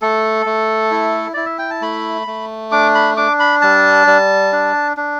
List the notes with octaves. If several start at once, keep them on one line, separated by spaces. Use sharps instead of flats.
A3 A4
A3
E4
E4 D5
E5
G5
A5
A3 B5
A3
D4 D6
B5
D4 D6
B5
G3 A5
G3
D4
D4